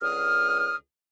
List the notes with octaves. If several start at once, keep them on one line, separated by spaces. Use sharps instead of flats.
C#2 D3 D#6 F6